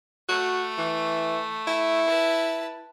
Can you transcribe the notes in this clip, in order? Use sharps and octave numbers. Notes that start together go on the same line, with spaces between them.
A3 F#4
E3
E4
B4 A5